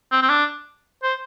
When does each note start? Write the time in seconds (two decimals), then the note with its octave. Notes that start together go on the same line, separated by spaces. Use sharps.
0.12 C4
0.22 C4
0.29 D4
1.03 C5